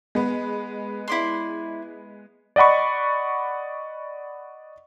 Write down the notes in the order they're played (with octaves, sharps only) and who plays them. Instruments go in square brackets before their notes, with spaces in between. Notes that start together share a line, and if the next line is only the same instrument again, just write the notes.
[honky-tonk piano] G#3 B3
[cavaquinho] E4 D5 C6
[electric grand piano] D5 D#5 F#5 B5 C#6